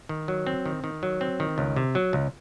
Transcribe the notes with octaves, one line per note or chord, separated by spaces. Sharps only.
D#3
F#3
C4
D#3
D#3
F#3
C4
D#3
C#2
C3
F#3
C#2